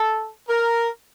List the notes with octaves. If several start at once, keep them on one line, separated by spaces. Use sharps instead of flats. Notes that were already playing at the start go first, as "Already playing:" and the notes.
Already playing: A4
A#4